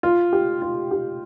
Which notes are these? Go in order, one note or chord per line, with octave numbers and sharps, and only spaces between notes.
F4
G4
F4
G4